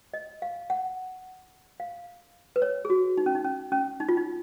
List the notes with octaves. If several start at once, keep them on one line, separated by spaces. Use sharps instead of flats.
D#5
F5
F#5
F5
B4
C#5
G#4
F#4
D#4
C#4
D#4
C#4
C#4
D#4
F4
D#4